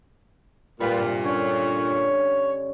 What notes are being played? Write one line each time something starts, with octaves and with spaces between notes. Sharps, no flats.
A#2 G3 F4 B4 B5
G2 C3
D3 C#4 C#5 C6